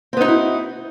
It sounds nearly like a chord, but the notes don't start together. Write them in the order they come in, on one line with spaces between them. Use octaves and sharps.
C4 B3 D#4 F#4 E4